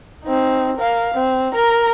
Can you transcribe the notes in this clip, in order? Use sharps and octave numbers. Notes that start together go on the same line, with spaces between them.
C4 D#4
A#4 F5
C4
A#4 A#5